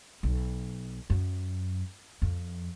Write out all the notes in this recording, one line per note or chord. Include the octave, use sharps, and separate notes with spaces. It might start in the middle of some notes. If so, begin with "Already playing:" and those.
B1
F#2
F2